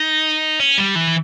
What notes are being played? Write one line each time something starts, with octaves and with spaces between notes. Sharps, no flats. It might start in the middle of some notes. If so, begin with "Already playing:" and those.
Already playing: D#4
C#4
G3
E3